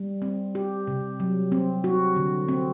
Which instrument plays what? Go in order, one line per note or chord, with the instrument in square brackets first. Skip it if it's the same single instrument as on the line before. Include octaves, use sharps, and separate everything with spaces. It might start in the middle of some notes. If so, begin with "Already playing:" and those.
Already playing: [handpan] G3
C4
G4
C3
F#3
C4
F#4
D3
C4